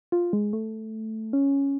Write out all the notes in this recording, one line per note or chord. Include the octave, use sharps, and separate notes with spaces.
F4
G#3
A3
C#4